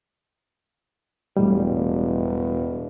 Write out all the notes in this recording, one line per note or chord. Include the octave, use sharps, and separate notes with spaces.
E1 A2 G3